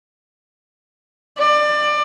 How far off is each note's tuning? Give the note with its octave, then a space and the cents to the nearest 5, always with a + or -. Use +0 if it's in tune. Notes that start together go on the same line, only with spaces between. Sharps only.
D5 +25